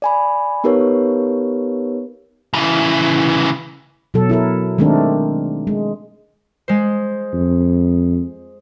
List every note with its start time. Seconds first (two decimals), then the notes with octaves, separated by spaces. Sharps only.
0.02 D5 G#5 B5
0.64 B3 D#4 G4 A#4 B4 C#5
2.54 C#3 E3
4.14 B2 F#3 A4
4.29 E4 A4 A#4
4.78 D#3 G#3 A3 C4 D4 A#4
5.67 G#3
6.68 G#3 C5
7.34 F2